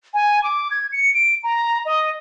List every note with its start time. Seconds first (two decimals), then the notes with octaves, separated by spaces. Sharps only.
0.14 G#5
0.44 D6
0.71 G#6
0.92 C#7
1.14 D7
1.44 A#5
1.85 D#5